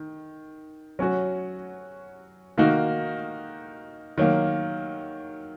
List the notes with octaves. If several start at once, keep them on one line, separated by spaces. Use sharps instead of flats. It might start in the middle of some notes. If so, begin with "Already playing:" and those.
Already playing: D#3
F#3 C#4 F#4
D#3 A#3 D#4 F#4
D#3 F#3 A#3